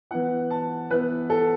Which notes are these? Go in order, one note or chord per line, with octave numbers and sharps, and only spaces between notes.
E3 B3 E4 F#5
A5
E3 B3 E4 B4
A4